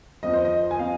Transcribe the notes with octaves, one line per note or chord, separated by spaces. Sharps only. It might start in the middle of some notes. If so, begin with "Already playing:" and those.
F2 F3 C4 D#5
C5
D#5
G#5
F3 C4 F5